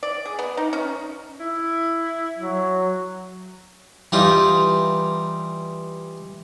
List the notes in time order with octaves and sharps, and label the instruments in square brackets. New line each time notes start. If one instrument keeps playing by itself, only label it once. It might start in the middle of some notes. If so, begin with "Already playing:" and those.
[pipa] D5
G#4
B3
D#4
C#4
[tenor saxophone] E4
[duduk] F#3
[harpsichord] E3 G3 D#4 F4